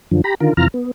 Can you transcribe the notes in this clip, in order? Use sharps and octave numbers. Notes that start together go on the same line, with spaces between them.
F#2 D3 F3
G4 A#5 B5
D3 D#3 F4 A#4
F2 C3 E3 F4 A#5 F6
B3